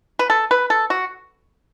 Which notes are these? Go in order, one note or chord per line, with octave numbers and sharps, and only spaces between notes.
B4
A4
B4
A4
F#4